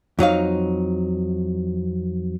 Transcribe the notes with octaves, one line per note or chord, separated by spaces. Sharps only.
F2 F#3 D#4 F5